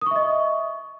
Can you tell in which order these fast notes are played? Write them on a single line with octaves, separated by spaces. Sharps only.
D#6 C#6 E5 D#5